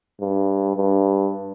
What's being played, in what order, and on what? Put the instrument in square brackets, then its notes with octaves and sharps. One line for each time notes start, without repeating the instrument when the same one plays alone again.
[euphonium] G2
G2